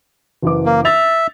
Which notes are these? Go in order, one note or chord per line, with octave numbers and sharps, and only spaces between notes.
F#1 E3 D6
A#3
E5 A6 F7